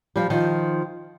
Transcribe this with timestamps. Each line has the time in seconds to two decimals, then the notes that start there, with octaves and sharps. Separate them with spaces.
0.16 F3 G3
0.30 D#3 F3